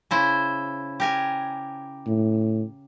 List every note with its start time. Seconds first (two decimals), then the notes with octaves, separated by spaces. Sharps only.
0.11 C#3 E4 C5
1.00 G4 A#4 G#5
2.07 A2